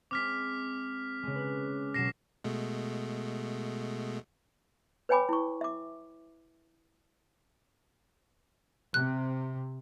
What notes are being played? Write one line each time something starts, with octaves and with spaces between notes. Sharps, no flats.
G#3 C4 D6 F6 B6
C#3 G#3
B4 F#6
B2 F#3 A#6 C7 E7
B2 G#3 A3
B4 C#5 G5 G#5 B5 D6
E4 C#6
E5 D6
C3 F#6